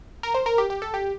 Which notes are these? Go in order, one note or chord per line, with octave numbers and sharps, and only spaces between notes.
A#4
C5
A#4
G4
G4
A4
G4